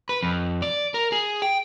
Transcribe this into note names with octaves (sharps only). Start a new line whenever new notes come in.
B4
F2
D5
A#4
G#4
G5